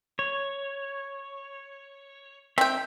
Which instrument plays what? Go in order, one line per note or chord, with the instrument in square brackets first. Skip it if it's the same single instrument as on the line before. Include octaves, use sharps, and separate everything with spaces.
[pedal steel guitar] C#5
[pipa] C4 G5 [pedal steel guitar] E5